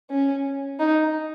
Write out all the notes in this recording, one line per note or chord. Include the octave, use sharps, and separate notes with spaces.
C#4
D#4